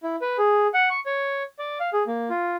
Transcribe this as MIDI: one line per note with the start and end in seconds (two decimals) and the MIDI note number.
0.03 0.16 64
0.22 0.37 71
0.38 0.67 68
0.74 0.89 78
0.90 1.00 85
1.06 1.43 73
1.59 1.79 74
1.80 1.90 77
1.93 2.03 68
2.07 2.29 58
2.30 2.56 65